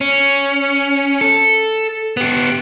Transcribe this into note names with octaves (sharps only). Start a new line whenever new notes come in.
C#4
A4
B3 G4